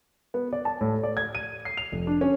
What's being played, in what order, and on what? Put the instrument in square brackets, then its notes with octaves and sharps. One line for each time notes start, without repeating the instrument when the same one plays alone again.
[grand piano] B3
D5
A5
A2
D5
G#6
D#7
C7
F7
F1
D4
C#4